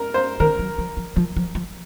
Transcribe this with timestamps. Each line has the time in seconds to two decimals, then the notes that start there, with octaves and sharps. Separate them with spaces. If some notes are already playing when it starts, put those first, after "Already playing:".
Already playing: A#4
0.14 C5
0.40 D#3 A#4
0.59 F#3
0.78 F3
0.97 F3
1.16 F3
1.37 F3
1.55 F3